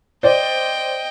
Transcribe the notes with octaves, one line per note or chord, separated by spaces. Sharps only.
C5 D5 D#5 G5